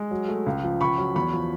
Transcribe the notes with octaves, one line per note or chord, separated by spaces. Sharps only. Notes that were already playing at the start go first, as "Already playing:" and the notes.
Already playing: G#3
F#3
A3
C#2
F3
C#2 B5 C#6
F#3
E2 B5 C#6
F3